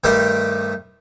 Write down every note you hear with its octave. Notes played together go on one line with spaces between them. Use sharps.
G2 D#3 G3 A3 G4 C5